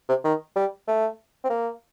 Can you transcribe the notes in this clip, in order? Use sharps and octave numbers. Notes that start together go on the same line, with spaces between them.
C3
D#3
G3
A3
C4
A#3